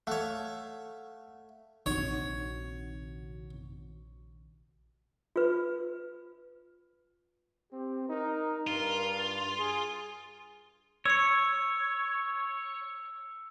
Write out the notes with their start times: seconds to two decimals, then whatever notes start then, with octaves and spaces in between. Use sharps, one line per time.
0.07 A3 C#5 F5 F#5
1.86 A#1 C3 D#3 D#4 F#4 C#5
5.36 F4 B4
7.73 C4 G4
8.09 D#4 A#4
8.67 G2 F4 A#4
9.59 G#4
11.05 C#5 E6 C#7